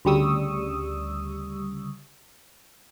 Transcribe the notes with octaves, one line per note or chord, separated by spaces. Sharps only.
D2 C#3 G3 C#6 D#6 E6